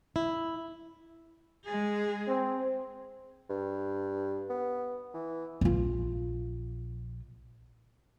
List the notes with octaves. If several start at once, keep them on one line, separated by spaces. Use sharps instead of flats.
E4
G#3 G#4
C4
G2
B3
E3
A#1 F4